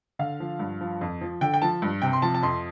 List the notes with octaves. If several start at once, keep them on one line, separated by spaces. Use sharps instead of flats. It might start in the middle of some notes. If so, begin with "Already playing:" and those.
D3 F5
F3
G2
F3
F2
F3
D3 G5
G5
F3 A5
G2
C3 G5
C6
F3 A5
A5
F2 C6